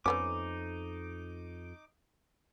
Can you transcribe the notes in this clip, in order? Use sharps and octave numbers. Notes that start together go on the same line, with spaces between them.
F2 A3 B3 C#4 D#4 D6